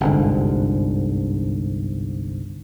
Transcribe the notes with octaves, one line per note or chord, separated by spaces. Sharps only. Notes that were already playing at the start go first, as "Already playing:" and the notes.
G1 C2 G#2 D3